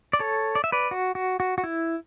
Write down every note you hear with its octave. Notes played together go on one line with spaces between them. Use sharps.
D5
A4 C#5
D5
E5
B4 D5
F#4
F#4
F#4
F#4
E4